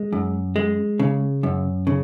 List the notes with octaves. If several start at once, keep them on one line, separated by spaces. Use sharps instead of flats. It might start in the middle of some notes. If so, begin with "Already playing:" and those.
Already playing: G#3
F#2
G#3
C#3
F#2
C#3